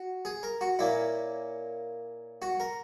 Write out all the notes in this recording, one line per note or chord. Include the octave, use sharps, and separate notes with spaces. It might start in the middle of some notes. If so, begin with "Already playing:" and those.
Already playing: F#4
G#4
A#4
F#4
A#2 A#3 C#4 E4
F#4
A#4